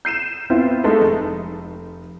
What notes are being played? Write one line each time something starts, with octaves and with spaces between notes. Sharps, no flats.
G6 C7 D#7 E7
B3 C4 E4 F4
G#3 A3 D#4 A4 D#5
F1